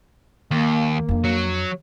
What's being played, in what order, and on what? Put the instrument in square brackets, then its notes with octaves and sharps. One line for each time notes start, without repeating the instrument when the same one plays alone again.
[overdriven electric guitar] D#2 [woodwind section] A#3
[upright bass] F2 D4
[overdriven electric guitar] F#3